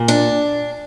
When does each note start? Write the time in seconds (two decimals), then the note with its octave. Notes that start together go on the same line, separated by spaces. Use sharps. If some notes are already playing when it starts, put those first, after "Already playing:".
Already playing: A#2
0.08 D4